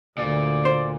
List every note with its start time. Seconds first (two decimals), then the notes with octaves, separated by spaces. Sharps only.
0.18 D2 A#2 D5
0.65 C5